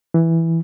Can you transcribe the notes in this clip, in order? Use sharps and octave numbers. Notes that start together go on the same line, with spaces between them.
E3